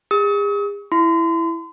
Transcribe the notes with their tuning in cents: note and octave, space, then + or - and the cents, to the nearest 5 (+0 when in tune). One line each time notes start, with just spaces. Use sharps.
G#4 -40 D#6 +45
E4 +5 C6 -40